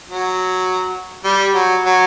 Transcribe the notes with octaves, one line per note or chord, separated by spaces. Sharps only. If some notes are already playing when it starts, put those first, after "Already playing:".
F#3
G3
F#3
F#3